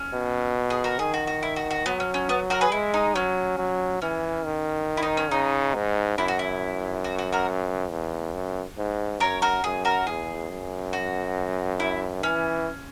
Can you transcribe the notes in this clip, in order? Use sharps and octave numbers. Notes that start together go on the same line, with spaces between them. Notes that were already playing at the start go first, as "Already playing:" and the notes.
Already playing: C#4
B2
G#4
F#4 A#4
D#3 G#4
F#4
F#4
E4
F#4
F#4
F#3 B3
C#4
C#4
B3
F#4 A#4
G#4 B4
G#3 E4
D#4
F#3 C#4
F#3
E3 C#4
D#3
E4
D#4
C#4
C#3 D#4
G#2
F#2 E4
F#4
E4
F#4
F#4
F#4 A#4
E2
F#2
G#2
F#2 A#4 C#5
F#4 A#4
F#2 G#4
F#4 A#4
E2 G#4
F#2
F#4
E4
E3 C#4